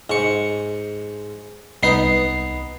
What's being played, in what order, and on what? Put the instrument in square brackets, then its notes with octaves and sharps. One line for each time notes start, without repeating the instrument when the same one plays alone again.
[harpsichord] G#2 C#6
[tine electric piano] C2 C7 [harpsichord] B3 D#4 B4